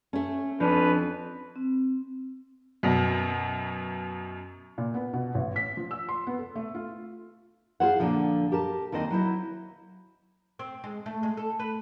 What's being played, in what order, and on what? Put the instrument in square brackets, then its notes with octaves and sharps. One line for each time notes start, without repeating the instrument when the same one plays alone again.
[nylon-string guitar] A3 C#4
[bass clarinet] F2 [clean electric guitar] F3 C#4 [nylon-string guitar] D4 [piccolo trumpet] B4
[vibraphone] C4
[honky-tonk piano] F#2 B2
[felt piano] A#2
B3
B2
A1
B6
F3
E6
C6
B3
A4
A3
F4
[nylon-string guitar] F4 G#4 C5 C#5 F#5
A#2 D3 F3
G4 A#4 A5
D#2 D#3 C4 C5 D#5
F#3 E4 C5
[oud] C4
G#3
A3
G#3
A4
B4